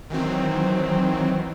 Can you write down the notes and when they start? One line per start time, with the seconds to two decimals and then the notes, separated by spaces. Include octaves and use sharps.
0.10 D#3 E3 F#3 C4